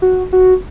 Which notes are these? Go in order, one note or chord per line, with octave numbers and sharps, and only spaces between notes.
F#4
F#4